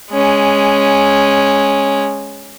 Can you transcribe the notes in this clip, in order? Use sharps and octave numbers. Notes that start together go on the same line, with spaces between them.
G#3 C#4